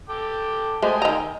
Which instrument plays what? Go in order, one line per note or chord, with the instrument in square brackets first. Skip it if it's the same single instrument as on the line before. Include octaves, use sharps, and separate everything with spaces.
[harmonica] A4 G5 D6
[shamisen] G#3 A3 C5 [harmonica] D#5 G5 G#5
[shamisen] D#3 A#5